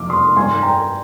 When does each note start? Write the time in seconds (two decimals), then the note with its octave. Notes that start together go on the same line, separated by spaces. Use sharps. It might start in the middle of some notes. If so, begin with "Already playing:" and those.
Already playing: F2 C3 D6 F6
0.10 C6 D#6
0.36 G2 D#3 G#5 C6
0.63 G5 A#5